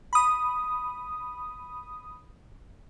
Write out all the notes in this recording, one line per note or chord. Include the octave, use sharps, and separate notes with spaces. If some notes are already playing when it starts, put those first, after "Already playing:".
B5 D#6